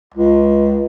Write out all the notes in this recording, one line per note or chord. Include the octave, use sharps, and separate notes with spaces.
C#2